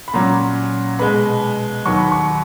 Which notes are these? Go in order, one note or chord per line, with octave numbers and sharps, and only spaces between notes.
B5
A#2 F#3 C#4 A#5
B2 G#3 B3 B5
D#2 D#3 F#3 C#6
B5
C#6